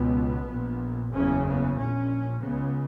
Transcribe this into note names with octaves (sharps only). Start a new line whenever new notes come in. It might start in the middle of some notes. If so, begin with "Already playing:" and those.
Already playing: C#2 B2 B3
A#1 A#2
F#1 E2 C#3 C#4
B3
A#1 A#2 C#4
C#2 C#3 B3